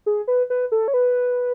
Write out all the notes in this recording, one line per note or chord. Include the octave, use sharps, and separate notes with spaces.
G#4
B4
B4
A4
C#5
B4